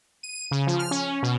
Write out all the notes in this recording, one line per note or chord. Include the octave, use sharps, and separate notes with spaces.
D#7
C#3
F3
F6
C#4
B2